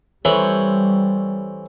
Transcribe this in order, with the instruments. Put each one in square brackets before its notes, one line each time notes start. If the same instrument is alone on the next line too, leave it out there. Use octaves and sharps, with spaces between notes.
[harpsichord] E3 B5 [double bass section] G3 [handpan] A4 C5 C#5